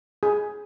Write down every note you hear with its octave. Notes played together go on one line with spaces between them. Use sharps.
G#4